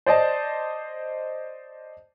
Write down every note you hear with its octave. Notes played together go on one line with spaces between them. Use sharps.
C5 D5 D#5 A5